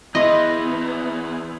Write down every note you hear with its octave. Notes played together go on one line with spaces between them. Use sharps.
E2 B3 E4 D#5 C6